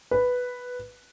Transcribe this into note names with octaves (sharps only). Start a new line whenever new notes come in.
B4